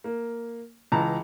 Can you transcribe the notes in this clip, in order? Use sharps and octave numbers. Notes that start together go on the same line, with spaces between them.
A#3
C#2 E3 A5 A#5